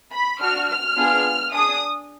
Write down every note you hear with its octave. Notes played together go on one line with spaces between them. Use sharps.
B5
D4 F#4 F6
F6
B3 D4 F4 G#4
D4 G#4 D#6